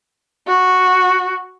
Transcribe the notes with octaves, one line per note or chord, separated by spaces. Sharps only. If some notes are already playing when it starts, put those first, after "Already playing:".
F#4